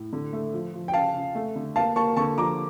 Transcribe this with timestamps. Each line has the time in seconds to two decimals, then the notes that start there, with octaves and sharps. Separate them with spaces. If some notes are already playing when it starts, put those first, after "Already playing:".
Already playing: A2
0.13 D3
0.33 A3
0.53 F3
0.74 F3
0.88 G5
0.94 C#3 F5 A5
1.14 C#3
1.35 A3
1.56 D3
1.76 A#3 F5 A5
1.96 A#3 A5 C#6
2.17 D3 A5 C#6
2.37 F3 A#5 D6